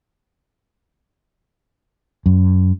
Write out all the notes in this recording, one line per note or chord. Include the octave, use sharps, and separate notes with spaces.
F#2